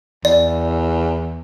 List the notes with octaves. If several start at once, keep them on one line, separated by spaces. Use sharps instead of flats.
E2 D5